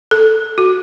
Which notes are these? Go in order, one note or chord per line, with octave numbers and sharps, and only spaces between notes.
A4
F#4